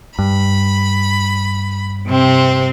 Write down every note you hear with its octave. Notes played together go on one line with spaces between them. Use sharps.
G2 B5
C3 C4